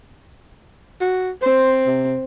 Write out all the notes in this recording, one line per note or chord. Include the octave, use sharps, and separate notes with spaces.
F#4
C4 C5
C3